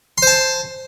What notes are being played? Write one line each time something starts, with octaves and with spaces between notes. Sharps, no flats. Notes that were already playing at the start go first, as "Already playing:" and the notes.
C5 A5 C6